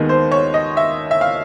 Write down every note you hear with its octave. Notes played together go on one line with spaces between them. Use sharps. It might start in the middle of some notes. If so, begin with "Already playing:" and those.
Already playing: D#2 D#3 G#3 B3
C5
C#5
D#5
E5
E5
F5